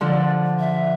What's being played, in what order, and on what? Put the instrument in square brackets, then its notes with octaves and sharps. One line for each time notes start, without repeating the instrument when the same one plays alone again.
[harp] D3 F3 [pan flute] D5
[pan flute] E5